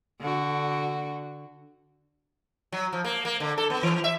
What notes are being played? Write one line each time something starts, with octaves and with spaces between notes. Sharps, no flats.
D3 F#4
F#3
F3
A#3
A#3
D3
A4
B3
E3
E5